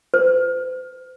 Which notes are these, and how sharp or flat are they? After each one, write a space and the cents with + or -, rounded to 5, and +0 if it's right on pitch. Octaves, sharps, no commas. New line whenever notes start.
C5 -40